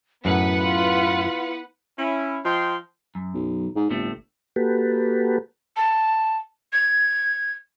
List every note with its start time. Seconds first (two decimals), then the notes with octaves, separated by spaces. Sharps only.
0.25 F#2 A2 B3 E4 B4 F#5
0.62 F4
1.98 C#4 E4
2.44 F3 D#5 G5 C6
3.15 F#2
3.34 B1
3.75 G#2
3.90 G1 A2 A3 C4
4.56 A#3 F#4 G4 A4 B4
5.77 A5
6.73 G#6